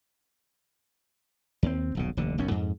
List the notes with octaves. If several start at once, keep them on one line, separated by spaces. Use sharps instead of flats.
D#2 C4
D#1 B1 C#3
F1 D#2 D3
F#1 B1 F#2 C#4
F2 G#2